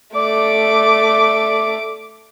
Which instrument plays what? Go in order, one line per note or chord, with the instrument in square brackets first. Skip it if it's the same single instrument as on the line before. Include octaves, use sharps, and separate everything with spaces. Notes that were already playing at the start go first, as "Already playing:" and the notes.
[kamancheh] A3 D6 [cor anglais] D5